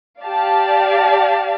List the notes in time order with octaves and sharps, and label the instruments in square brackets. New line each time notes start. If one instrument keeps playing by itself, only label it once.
[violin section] G4 D5 F5 A5